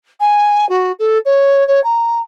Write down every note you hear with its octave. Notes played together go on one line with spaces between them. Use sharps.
G#5
F#4
A4
C#5
C#5
A#5